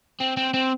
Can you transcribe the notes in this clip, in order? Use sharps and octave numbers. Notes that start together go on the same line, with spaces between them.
C4
C4
C4